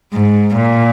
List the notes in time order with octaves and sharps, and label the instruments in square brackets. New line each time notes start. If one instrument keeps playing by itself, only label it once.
[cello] G#2
A#2